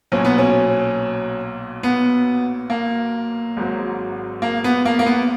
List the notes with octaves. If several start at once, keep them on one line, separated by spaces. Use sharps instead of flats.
B1 A#2 F#3 C#4
B3
C#4
B3
A#3
G#1 G#2 F#3
A#3
B3
A#3
A#3
B3